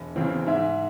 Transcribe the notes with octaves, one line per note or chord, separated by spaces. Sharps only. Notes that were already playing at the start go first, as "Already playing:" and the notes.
Already playing: E1
E2 C#3 E3 C4
G#2 E5